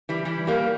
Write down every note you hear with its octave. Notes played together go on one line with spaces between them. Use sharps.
E3 G3
E3 G3
G3 A#3